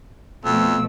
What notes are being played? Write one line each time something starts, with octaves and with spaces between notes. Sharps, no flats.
F2 B2 F3 A3 E6